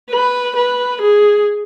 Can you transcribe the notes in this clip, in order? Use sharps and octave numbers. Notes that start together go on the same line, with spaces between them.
B4
B4
G#4